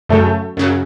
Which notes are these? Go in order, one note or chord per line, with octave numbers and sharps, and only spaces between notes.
F#2 C#3 F#3 A3
F#2 C#3 F#3